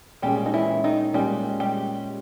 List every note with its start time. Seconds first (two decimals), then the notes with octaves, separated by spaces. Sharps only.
0.22 A#2 G3 G#3 C#4 G4 G#4
0.46 D#4
0.54 E3 E4
0.84 D#3 D#4
1.14 A#2 G3 G#3 C#4 G4 G#4
1.60 G3 G4